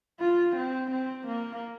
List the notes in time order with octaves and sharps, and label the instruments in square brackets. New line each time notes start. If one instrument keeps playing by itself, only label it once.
[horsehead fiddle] F4
C4
C4
A#3